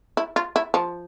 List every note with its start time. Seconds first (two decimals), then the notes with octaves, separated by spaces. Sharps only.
0.17 E4
0.36 F4
0.56 E4
0.74 F3